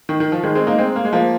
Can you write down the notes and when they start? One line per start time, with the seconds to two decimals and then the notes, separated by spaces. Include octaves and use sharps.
0.09 D#3
0.20 D#3
0.32 F3
0.43 D#3 G#3
0.55 G#3 C4
0.67 A#3 D#4
0.78 G#3 C4
0.96 A#3
1.05 G#3
1.13 F3 A#3